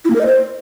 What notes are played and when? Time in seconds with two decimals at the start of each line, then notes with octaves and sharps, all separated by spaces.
0.05 E4
0.10 A#3
0.15 A#4
0.21 D#5
0.26 C5